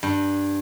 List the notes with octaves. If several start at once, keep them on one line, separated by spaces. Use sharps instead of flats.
G2